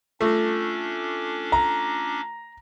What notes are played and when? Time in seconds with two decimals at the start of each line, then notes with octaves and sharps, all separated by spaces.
0.21 A3 C#4 D4 F4 D6 A#6
1.52 A#5